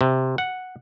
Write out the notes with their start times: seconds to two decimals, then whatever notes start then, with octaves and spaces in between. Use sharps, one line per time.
0.01 C3
0.38 F#5